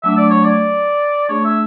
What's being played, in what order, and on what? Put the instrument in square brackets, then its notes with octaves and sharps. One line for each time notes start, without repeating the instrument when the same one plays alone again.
[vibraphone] F#3 A3 D4 [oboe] E5
[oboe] D5
C#5
D5
[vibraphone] A3 D4 G#4 [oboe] C#5
[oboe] E5